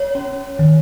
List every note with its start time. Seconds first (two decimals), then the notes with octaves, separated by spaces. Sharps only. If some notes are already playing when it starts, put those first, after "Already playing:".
Already playing: C#5
0.15 C#4
0.59 D#3